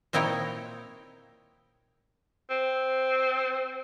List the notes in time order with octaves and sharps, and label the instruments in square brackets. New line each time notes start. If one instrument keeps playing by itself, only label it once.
[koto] A#2 C4 D#4 E4 C#5 G5
[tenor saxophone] C4